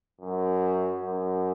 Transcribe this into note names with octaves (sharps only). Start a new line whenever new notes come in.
F#2
F#2